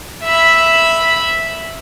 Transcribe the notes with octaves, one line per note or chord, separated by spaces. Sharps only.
E5 B5